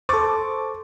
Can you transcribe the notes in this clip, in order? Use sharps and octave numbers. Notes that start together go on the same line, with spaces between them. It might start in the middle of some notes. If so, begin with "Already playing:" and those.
A4 C5 C#6 D6 A6